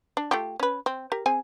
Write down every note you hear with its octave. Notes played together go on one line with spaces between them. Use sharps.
D4
A3 F4 G4
C#4 B4
C4
G4 A#4
C4 G#4 G#5